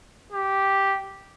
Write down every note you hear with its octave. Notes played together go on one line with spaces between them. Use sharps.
G4